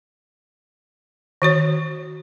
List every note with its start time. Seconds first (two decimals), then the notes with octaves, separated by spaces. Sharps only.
1.42 D#3 F#4 C#5